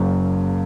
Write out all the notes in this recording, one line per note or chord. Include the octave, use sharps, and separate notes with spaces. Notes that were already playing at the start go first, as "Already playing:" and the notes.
Already playing: F#1 F#2 C#3 F#3 A#3